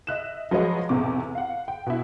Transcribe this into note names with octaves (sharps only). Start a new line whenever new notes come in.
D#5 E5 F#6 E7
F3 F#3 G#3 B4 C#5 D#5
B1 E2 A2 C3 D6
F5 F#5
G5
B2 E4